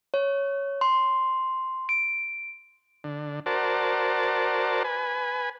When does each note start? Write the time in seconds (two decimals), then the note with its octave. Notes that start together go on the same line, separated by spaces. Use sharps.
0.14 C#5
0.81 C6
1.89 D7
3.04 D3
3.46 F#4 A#4 C5 D5 A5
4.84 B4 G#5